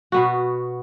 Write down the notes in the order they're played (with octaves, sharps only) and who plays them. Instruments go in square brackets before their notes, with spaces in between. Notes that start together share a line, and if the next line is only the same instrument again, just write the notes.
[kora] B2 B3 F#4